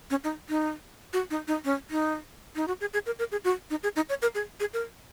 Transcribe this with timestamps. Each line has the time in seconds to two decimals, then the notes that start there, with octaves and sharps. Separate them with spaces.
0.10 C#4
0.24 D#4
0.49 D#4
1.13 F#4
1.30 D#4
1.48 D#4
1.65 C#4
1.91 D#4
2.56 D#4
2.68 F#4
2.81 G#4
2.93 G#4
3.06 A#4
3.19 A#4
3.32 G#4
3.44 F#4
3.70 D#4
3.83 G#4
3.96 D#4
4.09 C#5
4.22 A#4
4.35 G#4
4.60 G#4
4.73 A#4